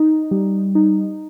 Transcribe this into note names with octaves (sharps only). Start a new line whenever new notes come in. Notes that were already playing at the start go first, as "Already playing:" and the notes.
Already playing: D#4
G3
D#4